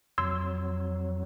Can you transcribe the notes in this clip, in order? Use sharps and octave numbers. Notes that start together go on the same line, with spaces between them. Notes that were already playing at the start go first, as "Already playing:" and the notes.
F2 F#3 C6 E6 G#6